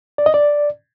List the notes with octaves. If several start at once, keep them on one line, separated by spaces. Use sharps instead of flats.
D5
D#5
D5